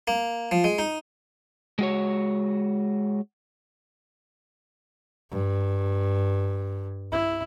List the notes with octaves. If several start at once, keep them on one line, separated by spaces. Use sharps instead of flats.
A#3
F3
G#3
D#4
G#3 F#4 C#5
G2
E4